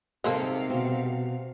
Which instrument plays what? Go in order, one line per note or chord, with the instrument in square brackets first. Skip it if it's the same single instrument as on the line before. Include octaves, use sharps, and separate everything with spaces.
[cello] C3 F5 [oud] D#3 C4 [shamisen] G#3 A#3 A4
[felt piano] B2 [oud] C4